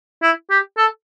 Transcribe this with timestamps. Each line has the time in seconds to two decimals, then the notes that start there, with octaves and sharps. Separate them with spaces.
0.22 E4
0.50 G4
0.77 A4